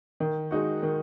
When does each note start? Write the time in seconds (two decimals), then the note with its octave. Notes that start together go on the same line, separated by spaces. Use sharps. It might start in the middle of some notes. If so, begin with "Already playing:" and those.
0.20 D#3
0.51 G#3 D#4 F#4
0.83 D#3